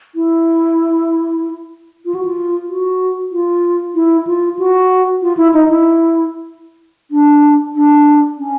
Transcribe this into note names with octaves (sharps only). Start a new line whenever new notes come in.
E4
F4
F#4
F4
F#4
F4
E4
F4
F#4
F4
E4
D#4
E4
D4
D4
C#4